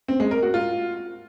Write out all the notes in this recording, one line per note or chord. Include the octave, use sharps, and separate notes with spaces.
C4
G#3
A#4
F#4
F4